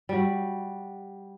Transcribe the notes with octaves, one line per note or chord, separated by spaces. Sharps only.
G3 F#4